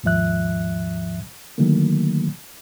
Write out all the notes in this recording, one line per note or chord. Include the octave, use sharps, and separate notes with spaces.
D#2 G#2 F3 E5 F#6
D3 D#3 F#3 A3 A#3